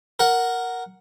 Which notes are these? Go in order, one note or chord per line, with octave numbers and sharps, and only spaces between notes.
A#4 F#5